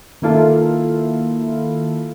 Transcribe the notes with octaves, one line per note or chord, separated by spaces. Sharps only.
D#3 A#3 E4 F4 A4